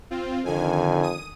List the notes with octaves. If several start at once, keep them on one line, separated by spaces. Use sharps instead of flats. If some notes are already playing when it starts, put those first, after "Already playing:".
C4 F4
F2 D3 D#3 G#5
D#6 D#7